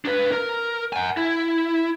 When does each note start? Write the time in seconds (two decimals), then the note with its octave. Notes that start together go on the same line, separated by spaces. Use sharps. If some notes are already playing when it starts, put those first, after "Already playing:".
0.05 D4 B4
0.31 A#4
0.93 F#5 G#5
1.17 E4